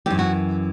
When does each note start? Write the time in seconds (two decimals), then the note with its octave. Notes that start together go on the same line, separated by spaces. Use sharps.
0.06 F#2 E3 G4
0.19 F#4